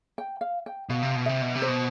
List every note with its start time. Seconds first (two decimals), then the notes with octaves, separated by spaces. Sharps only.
0.18 G5
0.41 F5
0.66 G5
0.89 B2 F5
1.03 C3
1.15 B2
1.26 C3 E5
1.42 B2
1.55 C3
1.62 C5
1.68 B2